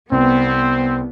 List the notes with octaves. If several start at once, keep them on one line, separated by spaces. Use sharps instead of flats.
C2 B3 C4